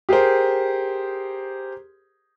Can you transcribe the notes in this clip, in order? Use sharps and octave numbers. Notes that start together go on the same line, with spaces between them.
G4 G#4 A#4 C5